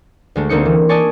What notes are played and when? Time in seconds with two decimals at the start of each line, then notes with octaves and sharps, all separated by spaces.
0.36 D2 G#3 A3
0.49 D2 A#3 C4 D#4 C#7
0.65 E3
0.89 D5 D#5 G#5 A5 C#6